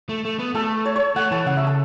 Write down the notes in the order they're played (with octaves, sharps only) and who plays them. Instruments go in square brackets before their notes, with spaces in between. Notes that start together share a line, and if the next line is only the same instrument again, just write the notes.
[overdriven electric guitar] A3
A3
B3
[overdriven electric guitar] A3 [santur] A4
[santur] C#5
C#5
[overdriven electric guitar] A3 [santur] F#5
[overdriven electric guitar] E3 [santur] A5
[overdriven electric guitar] C#3 [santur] F#5
[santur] E5
A4